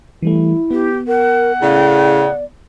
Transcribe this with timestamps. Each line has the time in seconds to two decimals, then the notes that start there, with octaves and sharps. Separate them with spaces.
0.22 E3 G3 A3 E4
0.71 B3 G4
1.07 A#4 F#5
1.62 A2 C#3 D5